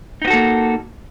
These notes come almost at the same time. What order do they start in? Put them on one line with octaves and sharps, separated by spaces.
D#4 B3 F#4 A4 A#3